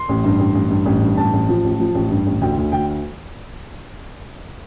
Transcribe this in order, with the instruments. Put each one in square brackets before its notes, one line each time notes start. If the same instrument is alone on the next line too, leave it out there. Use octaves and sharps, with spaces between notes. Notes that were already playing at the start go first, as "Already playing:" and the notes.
Already playing: [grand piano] C6
A1
G2
A1
A1
G2
A1
G2
A1 A5
A1
F3
A1
F3
A1
G2
A1
D2 G5
D2
D2 G5